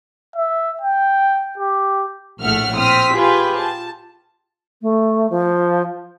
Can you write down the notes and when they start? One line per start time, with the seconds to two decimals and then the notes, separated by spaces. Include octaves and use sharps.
0.36 E5
0.81 G5
1.58 G4
2.40 A#1 A2 A3 E5 F#5 F6
2.76 C4 D#6 F6 B6
3.12 F4 G4 G#4 B4
3.58 A5
4.82 A3
5.30 F3